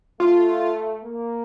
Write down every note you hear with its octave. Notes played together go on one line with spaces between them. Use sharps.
A3 F4
A#3